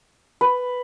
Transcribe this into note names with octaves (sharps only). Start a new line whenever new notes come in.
B4